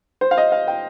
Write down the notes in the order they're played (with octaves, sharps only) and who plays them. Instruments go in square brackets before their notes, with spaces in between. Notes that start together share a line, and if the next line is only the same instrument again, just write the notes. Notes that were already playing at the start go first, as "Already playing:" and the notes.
[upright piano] C5
F5
D#5
F5
G5